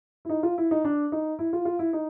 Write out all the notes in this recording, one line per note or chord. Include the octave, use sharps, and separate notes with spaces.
E4
D#4
F4
E4
D#4
D4
D#4
E4
F4
F4
E4
D#4